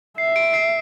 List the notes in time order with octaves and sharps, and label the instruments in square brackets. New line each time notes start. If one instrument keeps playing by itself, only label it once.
[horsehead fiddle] E5 [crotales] C7
[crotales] D7
C7